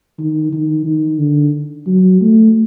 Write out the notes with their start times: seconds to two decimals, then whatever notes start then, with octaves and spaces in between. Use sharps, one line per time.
0.19 D#3
0.52 D#3
0.85 D#3
1.19 D3
1.86 F#3
2.21 A3